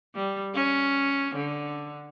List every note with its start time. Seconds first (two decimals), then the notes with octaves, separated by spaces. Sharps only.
0.15 G3
0.55 C#4
1.35 D3